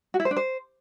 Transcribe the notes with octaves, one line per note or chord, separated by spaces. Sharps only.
F#4
E4
C5
D4
C5